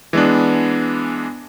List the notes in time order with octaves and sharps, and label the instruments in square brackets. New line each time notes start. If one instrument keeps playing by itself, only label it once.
[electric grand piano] E3 G#3 B3 D4